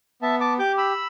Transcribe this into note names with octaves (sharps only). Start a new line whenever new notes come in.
B3 E5 A5
A5 D6
G4 D6 G6
B5 E6